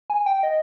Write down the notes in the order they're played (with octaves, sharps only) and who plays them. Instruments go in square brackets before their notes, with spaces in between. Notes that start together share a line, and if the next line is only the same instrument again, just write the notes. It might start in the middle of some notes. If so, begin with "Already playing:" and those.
[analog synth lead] G#5
G5
D#5